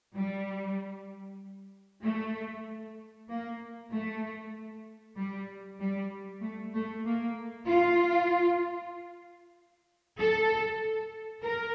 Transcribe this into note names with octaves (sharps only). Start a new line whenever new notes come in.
G3
A3
A#3
A3
G3
G3
A3
A3
A#3
F4
A4
A#4